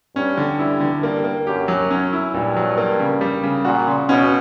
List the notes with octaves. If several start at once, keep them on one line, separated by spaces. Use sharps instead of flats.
G2 C#4
D3
G2 E4
D3
G2 A#3
A#3
F#2 G4
F#3
C#4
E4
G2 A#2
F#3
A#3
C#3
G3
C#3
A#2 F#4
C#3
B2 C#4